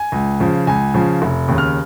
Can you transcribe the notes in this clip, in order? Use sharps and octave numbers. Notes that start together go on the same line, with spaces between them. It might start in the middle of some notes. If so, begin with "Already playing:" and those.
Already playing: G#5
C#2
C#3 F3
C#2 G#5
C#3 F3
F1
D#2 C#3
F6